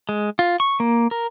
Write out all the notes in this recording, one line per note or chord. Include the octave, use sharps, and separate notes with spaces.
G#3
F4
C#6
A#3
A#4